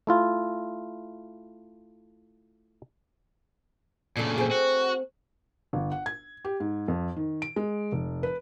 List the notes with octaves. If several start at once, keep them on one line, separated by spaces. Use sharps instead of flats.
A3 E4 F4
A#2 C#3 A3 D4
C4 G#4
F#4
G1
F#5
G#6
G4
G#2
F2
D#3
D7
G#3
F1
B4